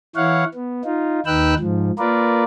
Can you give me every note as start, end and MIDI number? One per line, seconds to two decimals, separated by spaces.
0.16 0.44 52
0.16 0.44 64
0.16 0.44 73
0.16 0.44 77
0.16 0.44 78
0.55 0.82 59
0.84 1.20 63
0.84 1.20 65
1.26 1.54 39
1.26 1.54 63
1.26 1.54 71
1.26 1.54 79
1.26 1.54 88
1.26 1.54 90
1.59 1.91 44
1.59 1.91 53
1.99 2.44 58
1.99 2.44 65
1.99 2.44 70
1.99 2.44 71
1.99 2.44 74